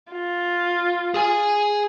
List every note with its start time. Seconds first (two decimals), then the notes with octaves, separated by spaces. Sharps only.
0.12 F4
1.14 G#4 G#5